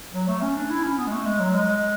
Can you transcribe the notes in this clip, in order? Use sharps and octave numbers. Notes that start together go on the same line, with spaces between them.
F#3
A3
C#4
D4
E4
C#4
B3
G#3
A3
G#3
F#3
G#3